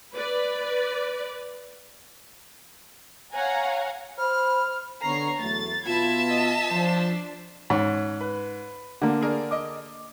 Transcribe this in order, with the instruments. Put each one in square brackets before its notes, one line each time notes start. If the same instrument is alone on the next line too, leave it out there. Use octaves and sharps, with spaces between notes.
[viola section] B4 D5
[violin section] C#5 F5 F#5 G#5 A#5
[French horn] C5 [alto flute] B5 [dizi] F6
[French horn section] D3 B3 [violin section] C#5 A#5 C7
[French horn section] E2 F#3 A3 [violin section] A6
[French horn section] B2 B3 F4 [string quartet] E5 A5 [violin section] B5 G#6
[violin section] D#5
[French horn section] F3 [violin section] D4 C5
[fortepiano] G#2 [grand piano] C#4
[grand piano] B4
[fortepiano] D3 A#3
[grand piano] G#4 A#4 D5
D#5 D6